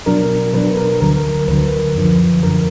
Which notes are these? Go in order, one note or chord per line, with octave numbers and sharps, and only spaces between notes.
B2 F#3 D4 A#4
B2 F#3 D4 B4
A#4
D2 D3 F#3 A#4
D2 D3 F#3 B4
F#2 D3 F3
F#2 D3 F3 A#4